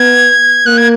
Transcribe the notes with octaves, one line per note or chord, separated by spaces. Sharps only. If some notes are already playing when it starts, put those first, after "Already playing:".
Already playing: B3 G#6
A#3 F#6
G#6